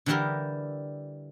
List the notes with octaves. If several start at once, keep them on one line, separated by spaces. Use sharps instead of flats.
D3 E3 G3 E4 G4 A#4